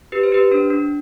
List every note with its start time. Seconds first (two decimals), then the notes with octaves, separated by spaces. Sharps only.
0.12 G4 B4
0.23 C5
0.32 G4 B4
0.51 D4 C5
0.70 D4